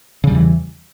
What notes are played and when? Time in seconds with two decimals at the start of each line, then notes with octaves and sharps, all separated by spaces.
0.24 C#3
0.27 G3
0.31 E2
0.35 E3